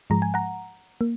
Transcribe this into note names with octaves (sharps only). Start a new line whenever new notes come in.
G#2 F3 G#3 A#5
G#5
F#5 A#5
A#3